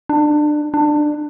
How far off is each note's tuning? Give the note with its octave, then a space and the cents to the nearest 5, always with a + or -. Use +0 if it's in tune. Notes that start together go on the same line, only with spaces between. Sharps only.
D4 +25
D4 +20